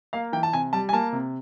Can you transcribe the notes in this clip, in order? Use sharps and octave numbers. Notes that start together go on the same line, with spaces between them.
A#3 F5
E3 G5
A5
C3 G#5
G3 A5
G#5
A#3 A5
C3